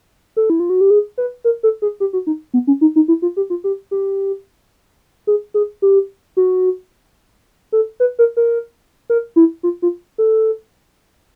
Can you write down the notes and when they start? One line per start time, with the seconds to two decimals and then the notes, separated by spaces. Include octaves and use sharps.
0.37 A4
0.50 E4
0.60 F4
0.70 F#4
0.81 G4
0.90 G#4
1.18 B4
1.44 A#4
1.63 A4
1.82 G#4
2.00 G4
2.13 F#4
2.27 D#4
2.54 B3
2.67 C#4
2.81 D#4
2.96 D#4
3.08 E4
3.22 F4
3.37 G4
3.50 F4
3.64 G4
3.91 G4
5.27 G#4
5.54 G#4
5.82 G4
6.37 F#4
7.72 A4
8.00 B4
8.19 A#4
8.37 A#4
9.10 A#4
9.36 E4
9.63 F4
9.82 F4
10.18 A4